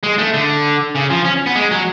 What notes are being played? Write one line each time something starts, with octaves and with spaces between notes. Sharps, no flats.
G#3
A3
D3
C#3
F3
C#4
B3
G#3
F#3